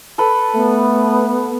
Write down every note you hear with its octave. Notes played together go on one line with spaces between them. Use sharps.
A4 B4
A3 B3